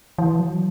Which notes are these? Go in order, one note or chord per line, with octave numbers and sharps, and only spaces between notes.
E3
F#3